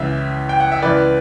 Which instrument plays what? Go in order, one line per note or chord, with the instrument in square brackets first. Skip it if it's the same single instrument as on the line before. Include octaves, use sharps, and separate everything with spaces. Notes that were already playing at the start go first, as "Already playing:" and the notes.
Already playing: [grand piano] C#2 C#3 E3 E5
G5
F#5
E5
C#2 C#3 E3 B4 D5